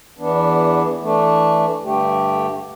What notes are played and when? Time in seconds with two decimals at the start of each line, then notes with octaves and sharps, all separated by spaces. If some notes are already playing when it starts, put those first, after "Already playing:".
0.18 E2 E3 B3 D4
1.00 E3 A3 D4
1.81 G2 D3 A3 G4